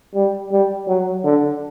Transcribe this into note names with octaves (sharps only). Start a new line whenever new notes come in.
G3
G3
F#3
D3